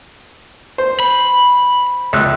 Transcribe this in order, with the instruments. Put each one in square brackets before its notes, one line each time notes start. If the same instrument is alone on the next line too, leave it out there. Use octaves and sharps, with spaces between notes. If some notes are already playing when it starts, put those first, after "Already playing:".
[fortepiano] C5
[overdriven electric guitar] B5
[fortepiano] C#2 E5 F#6